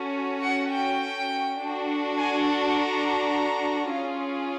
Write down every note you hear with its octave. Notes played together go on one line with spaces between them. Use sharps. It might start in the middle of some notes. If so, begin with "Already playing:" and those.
Already playing: C#4 F#4 A4
F#5
G5
D4 F#4 A4
G#5
A5
A#5
C#4 F4 G#4